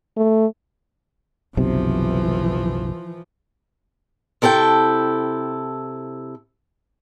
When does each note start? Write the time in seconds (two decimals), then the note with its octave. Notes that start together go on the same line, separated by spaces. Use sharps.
0.17 A3
1.57 F#1 B1 C3 E3 F3
4.42 C3 E4 A4 C5 G5